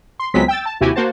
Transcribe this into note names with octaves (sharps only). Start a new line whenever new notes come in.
C6
C#2 F#3 G#3 B3 C4 B6
G5 E6 A6
A5
D#2 C3 E4 F#4 G4 G#5
A#3 F#4 C5 A5